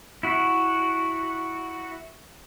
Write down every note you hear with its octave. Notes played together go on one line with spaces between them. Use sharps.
E4 F#4